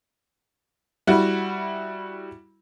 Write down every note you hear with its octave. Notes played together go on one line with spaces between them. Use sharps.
G3 E4 F#4